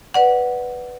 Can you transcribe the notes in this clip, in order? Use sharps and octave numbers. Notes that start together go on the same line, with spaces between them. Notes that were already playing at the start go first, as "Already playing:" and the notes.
B4 D5 F#5